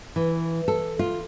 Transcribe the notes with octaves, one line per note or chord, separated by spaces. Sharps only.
E3
A4
F4